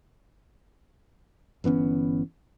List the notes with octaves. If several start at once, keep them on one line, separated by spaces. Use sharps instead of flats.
G1 E3 B3 C#4